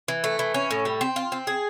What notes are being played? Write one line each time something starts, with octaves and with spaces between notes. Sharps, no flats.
E3
A3
E3
C#4
A2
G3
C4
F4
C4
G#4